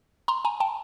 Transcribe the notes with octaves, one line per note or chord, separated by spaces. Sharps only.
A#5 C6
G#5 A#5
G5 A5